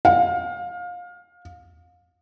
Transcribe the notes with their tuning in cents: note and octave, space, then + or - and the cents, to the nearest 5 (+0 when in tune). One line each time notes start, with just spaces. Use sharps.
F5 +25